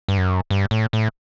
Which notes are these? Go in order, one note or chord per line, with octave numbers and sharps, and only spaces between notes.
G2
F#2
G2
A2
A2